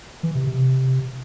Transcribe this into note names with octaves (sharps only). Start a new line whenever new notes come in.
E3
C3
C3